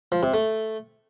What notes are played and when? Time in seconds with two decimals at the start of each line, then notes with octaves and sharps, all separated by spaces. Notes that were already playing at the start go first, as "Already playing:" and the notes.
0.12 F3
0.23 C3
0.34 A3